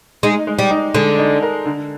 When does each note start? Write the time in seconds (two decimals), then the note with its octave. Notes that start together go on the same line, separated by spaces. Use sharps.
0.23 G#3 D#4
0.47 G#3
0.59 G3
0.71 D#4
0.95 D3 G#3
1.19 D#4
1.43 A#4
1.65 D3